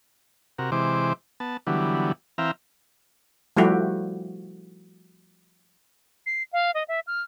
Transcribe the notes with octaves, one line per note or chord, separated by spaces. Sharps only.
C3 F#4 A#4
C3 E3 G#3 C5 D6
B3 A5
D3 E3 F#3 G3 B3
E3 C4 E5 F5 G5 A#5
F3 G3 A3 E4 F#4 G4
C7
F5
D#5
E5
F6